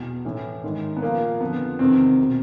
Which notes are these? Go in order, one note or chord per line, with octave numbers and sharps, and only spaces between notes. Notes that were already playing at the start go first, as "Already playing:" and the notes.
Already playing: E2 B2
A2 E3
G#2 D#3
B3
A#2 F3 A#3
F2 D3 F3 B3
E2 C3 D#3 C4
B2